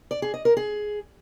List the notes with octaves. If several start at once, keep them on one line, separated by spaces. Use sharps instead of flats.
D5
G#4
D#5
A#4
G#4